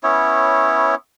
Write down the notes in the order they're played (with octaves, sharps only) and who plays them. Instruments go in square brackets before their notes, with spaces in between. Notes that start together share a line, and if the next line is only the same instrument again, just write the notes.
[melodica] B3 C#4 E4 C#5